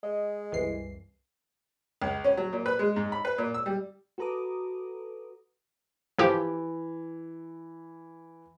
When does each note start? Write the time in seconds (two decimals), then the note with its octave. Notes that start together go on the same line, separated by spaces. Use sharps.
0.03 G#3 D#5
0.52 C2 F#2 E3 C7
2.02 C#2
2.24 C#4
2.37 F#3
2.53 A#2
2.66 B4
2.79 G#3
2.96 G#2
3.12 B5
3.25 B4
3.38 A#2
3.54 E6
3.66 G3
4.18 F#4 A4 B4 A#5 D6 D#6
6.18 E3 F3 G4